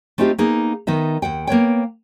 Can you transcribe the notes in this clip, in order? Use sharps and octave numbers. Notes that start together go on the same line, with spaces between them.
A3 C4 D#4 F4 G4
A#3 B3 D#4 G#4
D#3 B3 D#4 E5
D#2 F#5 G5
A#3 B3 C#5 G5